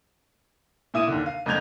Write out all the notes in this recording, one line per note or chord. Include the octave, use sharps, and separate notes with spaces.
A#2 E4 D#6 D#7
D#2 D3
F5
F2 D3 A#3 G6 G#6 F7